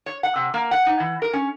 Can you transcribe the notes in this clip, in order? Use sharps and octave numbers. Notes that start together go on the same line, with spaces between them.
C#5
F#5
C3
A#3
F#5
D#4
E3
A#4
C#4